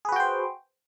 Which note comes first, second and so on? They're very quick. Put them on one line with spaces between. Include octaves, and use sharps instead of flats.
G#4 B4 F#4 G5 C5